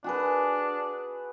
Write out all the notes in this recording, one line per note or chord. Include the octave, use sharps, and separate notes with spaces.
D4 F#4 G#4 B4